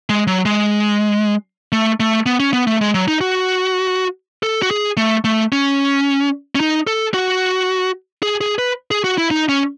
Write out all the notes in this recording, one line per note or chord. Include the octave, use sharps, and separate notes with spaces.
G#3
F#3
G#3
A3
A3
B3
C#4
B3
A3
G#3
F#3
D#4
F#4
A4
F#4
G#4
A3
A3
C#4
C#4
D#4
A4
F#4
G#4
G#4
B4
G#4
F#4
E4
D#4
C#4